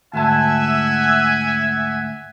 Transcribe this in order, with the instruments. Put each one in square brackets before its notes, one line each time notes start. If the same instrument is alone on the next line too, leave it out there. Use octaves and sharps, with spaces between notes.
[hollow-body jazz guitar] D2 G#2 A5 [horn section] E5 F#5 G#5